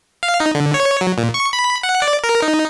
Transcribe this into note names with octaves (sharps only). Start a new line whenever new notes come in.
F5
D#4
D3
C#5
F#3
A#2
C#6
B5
F#5
D5
A#4
D#4